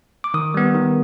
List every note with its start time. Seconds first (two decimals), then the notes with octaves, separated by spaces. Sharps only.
0.24 D6
0.34 D#3 D#6
0.54 G3 B3
0.74 D#3